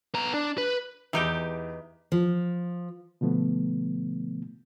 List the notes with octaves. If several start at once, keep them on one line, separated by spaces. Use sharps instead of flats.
B3 A#5
D4
B4
E2 E3 D#4 G4 D7
F3
B2 D3 F3 A3 B3